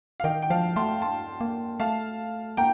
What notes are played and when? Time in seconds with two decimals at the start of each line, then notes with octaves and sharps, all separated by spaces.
0.20 F5
0.24 D#3 D#5 G5
0.42 G5
0.50 F3 F5 A5
0.76 A3 A5 C6
1.02 A5 C6
1.41 A#3
1.80 A3 F5 A5
2.57 A#3 G5 A#5